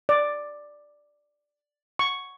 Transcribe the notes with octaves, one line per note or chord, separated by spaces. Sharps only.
D5
C#6